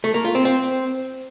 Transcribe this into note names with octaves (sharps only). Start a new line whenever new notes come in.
A3
A#3
F4
C4
C4